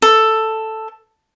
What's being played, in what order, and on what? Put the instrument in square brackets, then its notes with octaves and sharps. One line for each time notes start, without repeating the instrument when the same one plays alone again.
[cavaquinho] A4